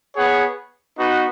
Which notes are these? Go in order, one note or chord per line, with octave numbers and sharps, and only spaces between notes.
B3 G#4 C#5 F#5
B3 D#4 F#4